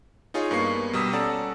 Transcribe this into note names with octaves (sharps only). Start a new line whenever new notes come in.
D#4 F4 G#4 C#5
G2 A#3 B3 C#6 C7
B2 G3 A#5 D#6 E6 B6
C#4 A4 D5 F#5 A5 A#5